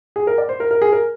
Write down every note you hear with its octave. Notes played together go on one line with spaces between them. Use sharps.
G#4
A#4
D5
C5
A#4
A#4
G#4
A#4